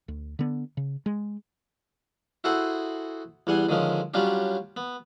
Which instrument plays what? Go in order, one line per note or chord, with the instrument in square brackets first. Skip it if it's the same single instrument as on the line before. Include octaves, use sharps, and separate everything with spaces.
[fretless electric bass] D2
D3 B3
C#3
G#3
[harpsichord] E4 F#4 G#4 A4 C5 F#5
E2 G3 F#5 G#5 C6
D3 D#3 F3 G#3 C#4
F#3 G3 C#4 D4 F4 G4
B3